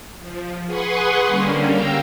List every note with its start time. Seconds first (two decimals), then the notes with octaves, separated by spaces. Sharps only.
0.18 F3
0.67 G#4 B4 F#5 C6 C#6 D#6
1.26 D3 G3 A#3 C#4
1.67 A#4 F5 G5 A#5 E6